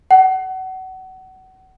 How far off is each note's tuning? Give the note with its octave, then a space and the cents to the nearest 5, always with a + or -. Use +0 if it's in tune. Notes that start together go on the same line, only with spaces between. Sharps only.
F#5 +30